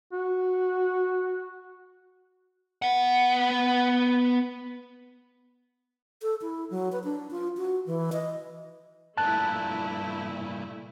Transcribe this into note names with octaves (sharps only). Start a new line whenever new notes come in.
F#4
B3 F#5
A4
E4
F#3
B4
D4
F4
F#4
E3
D#5
G2 A#2 A3 E4 A5 F#6